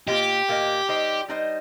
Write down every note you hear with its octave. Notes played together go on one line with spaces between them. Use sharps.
A#2 A#3 F4 G4 D#5
A#2 A#3 F4 D#5
G3 D#4 C5 D#5
G3 D#4 C5 D#5